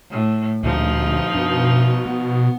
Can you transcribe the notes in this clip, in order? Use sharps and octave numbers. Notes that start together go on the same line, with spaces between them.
A2
D2 A#2 D3 F3 D#4
F#2 B2 D4
B3